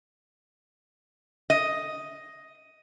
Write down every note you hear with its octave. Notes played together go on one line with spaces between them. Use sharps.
D#5